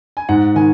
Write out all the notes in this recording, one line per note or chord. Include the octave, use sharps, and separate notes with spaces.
G#5
G#2 F#5
D#3 G#5